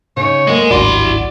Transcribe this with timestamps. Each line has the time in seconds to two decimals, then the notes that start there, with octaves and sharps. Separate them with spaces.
0.17 C#3 D#4 C#5
0.47 D2 G#3 A#3
0.71 D1 G#1 D4 E4 F#4 D5 C6